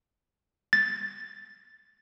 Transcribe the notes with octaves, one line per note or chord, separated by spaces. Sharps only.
A6